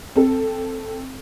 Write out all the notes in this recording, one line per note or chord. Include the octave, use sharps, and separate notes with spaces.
C4 A4